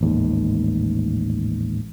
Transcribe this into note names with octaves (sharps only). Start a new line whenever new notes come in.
A1 D#2 G#2